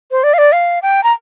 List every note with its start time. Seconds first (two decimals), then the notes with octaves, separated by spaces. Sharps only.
0.11 C5
0.23 D5
0.34 F5
0.38 D5
0.52 F5
0.82 G5
1.04 A#5